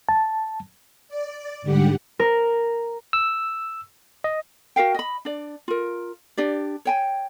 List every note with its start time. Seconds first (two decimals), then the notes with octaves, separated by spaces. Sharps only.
0.09 A5
1.08 D5
1.62 G#2 D3 G3 G4 F#5
2.19 A#4
3.13 E6
4.24 D#5
4.76 F#4 A#4 F5 G5
4.95 D#5 B5
5.25 D4 D5
5.68 F4 A#4
6.37 D4 G4 D5
6.85 C#5 G5 G#5